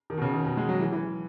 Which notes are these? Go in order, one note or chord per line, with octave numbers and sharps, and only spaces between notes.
D#3
B2
C#3
D#3
B2
G#3
F#3
E3
E3